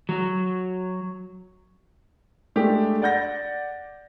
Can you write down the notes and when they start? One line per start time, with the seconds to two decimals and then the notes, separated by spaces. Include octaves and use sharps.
0.09 F#3
2.56 G#3 A3 D4 G4
3.02 D5 F#5 G6 A#6